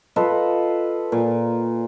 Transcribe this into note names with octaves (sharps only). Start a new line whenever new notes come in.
F4 A4 B4 D#5
A#2